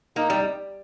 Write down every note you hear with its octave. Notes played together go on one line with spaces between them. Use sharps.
A#3 D#4
G3